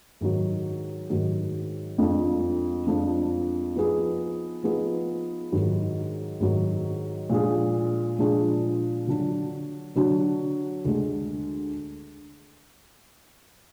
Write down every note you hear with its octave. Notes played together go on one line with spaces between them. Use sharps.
G#2 D#3 F#3
G#2 D#3 F#3
F2 F3 G#3 D4
F2 F3 G#3 D4
F3 B3 D#4 G#4
F3 B3 D#4 G#4
G#2 D#3 F#3
G#2 D#3 F#3
A#2 F3 G#3 D4 G#4
A#2 F3 G#3 D4 G#4
D3 F#3 D4 F#4
D3 F#3 D4 F#4
D2 D3 G#3